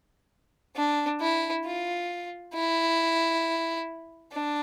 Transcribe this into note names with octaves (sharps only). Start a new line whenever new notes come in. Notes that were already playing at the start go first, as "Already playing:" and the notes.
D4
E4
F4
E4
D4